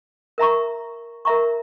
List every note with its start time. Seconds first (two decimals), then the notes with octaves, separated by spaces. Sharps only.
0.38 A#4 E5 A#5 C#6
1.25 A#4 E5 A#5 C#6